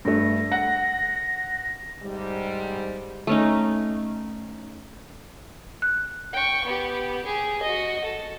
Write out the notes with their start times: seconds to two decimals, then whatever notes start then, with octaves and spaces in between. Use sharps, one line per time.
0.05 G2 A3 A#6
0.52 F#5
2.03 G#2 C3 G3
3.27 A3 C#4 D#4
5.82 F#6
6.33 G5 C#6
6.65 B3 G4
7.24 G4 G#4
7.62 F#4 D#5
8.04 A4